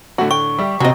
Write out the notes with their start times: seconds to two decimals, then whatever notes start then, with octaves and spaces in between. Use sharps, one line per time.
0.18 A2 D3 A3 F#4
0.31 G5 C#6
0.59 G3 G4 E5
0.80 A1 C3 C4 F#4 D#5 G5 A#5